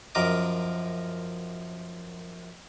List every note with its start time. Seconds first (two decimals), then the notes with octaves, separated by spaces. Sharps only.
0.15 F#2 F3 A#4 D#5 D6